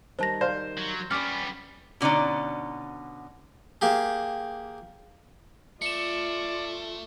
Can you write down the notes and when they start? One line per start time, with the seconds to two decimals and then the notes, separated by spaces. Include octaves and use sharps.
0.19 D#3 G3 D#4 C5 A5 A#6
0.41 C5 D5 F5
0.77 F#3
1.11 G3 B3 C#4 D5 D6 F6
2.01 B2 D3 C#4 D#4 D5
3.81 A#3 G4 G#4
5.82 A3 F4 D5 C#7 E7